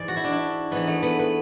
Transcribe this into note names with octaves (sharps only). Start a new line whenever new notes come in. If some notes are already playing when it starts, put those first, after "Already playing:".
Already playing: G#2 E3 D5
F#4
E4
D4
E4
G#2 E3 B3
A3
B3
B3